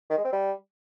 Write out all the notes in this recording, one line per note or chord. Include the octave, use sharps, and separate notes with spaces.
D#3
G#3
C4
G3